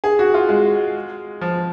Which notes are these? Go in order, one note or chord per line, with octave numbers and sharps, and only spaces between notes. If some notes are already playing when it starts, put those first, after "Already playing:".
G#4
F#4
F4
G#3
F3